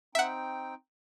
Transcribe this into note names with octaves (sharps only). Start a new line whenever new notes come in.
C4 D#4 E5 F#5 G5